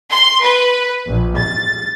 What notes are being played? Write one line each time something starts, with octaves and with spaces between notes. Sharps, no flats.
C6
B4
A#1
A6